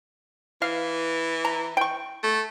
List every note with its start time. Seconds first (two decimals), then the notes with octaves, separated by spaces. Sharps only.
0.62 E3 F5
1.45 A#5
1.77 G5 C#6
2.23 A3